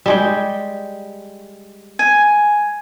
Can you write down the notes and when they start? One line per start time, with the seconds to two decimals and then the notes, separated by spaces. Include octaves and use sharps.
0.06 G3 G#3 G5
1.99 G#5